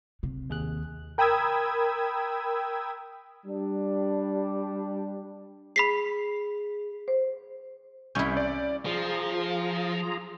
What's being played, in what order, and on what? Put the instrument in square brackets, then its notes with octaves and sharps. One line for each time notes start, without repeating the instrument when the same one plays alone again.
[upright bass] C3
[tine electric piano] D#2 G#4 F#6
[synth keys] A#4 G5 B5 D#6 E6 G#6
[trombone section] G3 D4
[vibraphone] G#4 [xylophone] B5 B6 C7
[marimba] C5
[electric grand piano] C2 G6 [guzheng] C#4 E4
[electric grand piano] D5
[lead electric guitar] F3 [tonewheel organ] F4 G#4 A#5